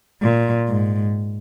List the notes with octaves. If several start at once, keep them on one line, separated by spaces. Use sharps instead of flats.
A#2
G#2